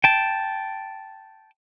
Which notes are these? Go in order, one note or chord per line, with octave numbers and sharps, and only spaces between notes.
G5 A5